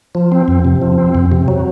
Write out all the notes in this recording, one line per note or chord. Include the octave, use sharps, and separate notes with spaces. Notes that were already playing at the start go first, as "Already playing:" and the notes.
F3
C4
F2
C3
F3
C4
F2
C3
F#3